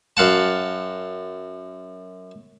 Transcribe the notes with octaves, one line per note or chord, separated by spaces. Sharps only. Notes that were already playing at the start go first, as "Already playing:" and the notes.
F#2 F5 F#5 A5